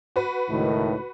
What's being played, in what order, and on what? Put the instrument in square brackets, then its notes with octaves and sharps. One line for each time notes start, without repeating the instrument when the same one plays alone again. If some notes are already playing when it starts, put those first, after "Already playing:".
[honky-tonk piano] F#4 B4
[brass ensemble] C#2 A2 D#3